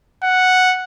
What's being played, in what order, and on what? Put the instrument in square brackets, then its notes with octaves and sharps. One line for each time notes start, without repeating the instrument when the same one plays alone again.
[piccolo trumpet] F#5